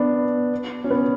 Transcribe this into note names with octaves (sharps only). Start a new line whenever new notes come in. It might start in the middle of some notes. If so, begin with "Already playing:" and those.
Already playing: B3 D4
C#4
B3